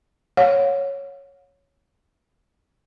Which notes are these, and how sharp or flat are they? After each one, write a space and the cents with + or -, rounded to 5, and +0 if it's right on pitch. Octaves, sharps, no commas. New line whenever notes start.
C#5 +0 F5 +45